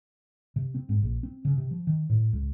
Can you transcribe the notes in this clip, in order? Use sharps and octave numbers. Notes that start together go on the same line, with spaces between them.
C3
C4
G#2
A#1
C4
C#3
C3
F3
D#3
A2
C#2